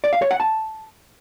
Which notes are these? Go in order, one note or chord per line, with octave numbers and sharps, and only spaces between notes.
D5
F5
C#5
F#5
A5